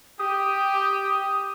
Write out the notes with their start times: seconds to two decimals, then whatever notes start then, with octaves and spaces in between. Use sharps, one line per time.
0.19 G4 D#6